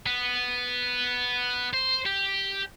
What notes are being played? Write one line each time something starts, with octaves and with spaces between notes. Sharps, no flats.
B3
C5
G4